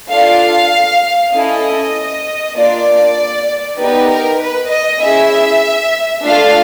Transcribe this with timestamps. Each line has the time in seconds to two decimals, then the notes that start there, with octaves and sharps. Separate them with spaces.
0.10 D4 F4 A4 F5
1.33 C#4 E4 A4 D#5
2.56 A#3 D4 F4 D5
3.79 B3 D#4 G4 B4
4.10 A#4
4.40 B4
4.71 D#5
5.01 C#4 E4 G#4 E5
6.24 A3 D4 F4 A4 F5